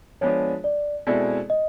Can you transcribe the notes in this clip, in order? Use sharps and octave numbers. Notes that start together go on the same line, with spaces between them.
F3 G#3 B3 D4 C#5
D5
B2 G#3 C4 E4 A4 D5
D#5